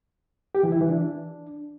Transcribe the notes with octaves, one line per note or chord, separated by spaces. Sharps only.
G4
E3
E4
E3
D4